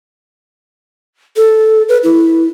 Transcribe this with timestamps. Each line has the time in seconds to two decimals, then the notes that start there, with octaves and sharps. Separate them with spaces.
1.37 A4
1.89 B4
2.04 E4